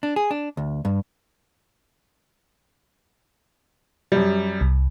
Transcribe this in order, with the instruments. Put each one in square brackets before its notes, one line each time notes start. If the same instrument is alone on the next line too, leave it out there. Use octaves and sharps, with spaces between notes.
[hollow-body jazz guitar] D4
G#4
D4
D2
G2
[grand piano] F#2 G3
[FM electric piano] C2